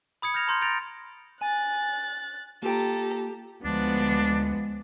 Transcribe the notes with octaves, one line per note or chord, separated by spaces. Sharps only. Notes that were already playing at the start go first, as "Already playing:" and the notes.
B5 D#6 G#6 C#7
F6 G6 G#6 A#6 F7
A#5 C6 G6
G6 A6 A#6 D7 F7
G#5 F#6 A6
A#3 F4 G4 A4 G5 A#5
D2 F3 G#3 B3 D4